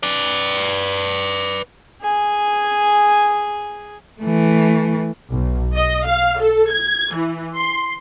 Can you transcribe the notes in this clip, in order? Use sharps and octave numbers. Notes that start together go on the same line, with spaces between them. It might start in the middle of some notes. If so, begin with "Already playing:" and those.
B4 D5
G#4 G#5
E3 A3
B1
D#5
F5
A4
G#6
E3
C6